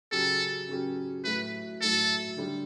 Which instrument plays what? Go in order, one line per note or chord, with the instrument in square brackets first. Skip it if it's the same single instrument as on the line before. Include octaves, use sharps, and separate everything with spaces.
[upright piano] C#3 F#3 C#4 G4 [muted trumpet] A4
[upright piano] C#3 F#3 C#4 G4
[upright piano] A2 F#3 A3 [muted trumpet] B4
[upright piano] A2 F#3 A3 [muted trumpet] A4
[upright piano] D3 G3 D4